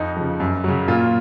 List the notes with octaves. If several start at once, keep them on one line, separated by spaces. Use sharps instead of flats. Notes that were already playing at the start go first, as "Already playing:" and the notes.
Already playing: F2 D#4
C#3 F3
F#2
C#3 F#3
A#2 F4